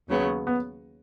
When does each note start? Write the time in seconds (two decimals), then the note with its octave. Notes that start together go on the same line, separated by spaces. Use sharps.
0.08 D#2 C#3 F#3 B3
0.47 B3